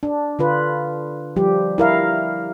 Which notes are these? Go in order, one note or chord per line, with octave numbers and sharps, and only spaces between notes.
D4
D3 F4 B4
F3 G3 G4
E4 A#4 F5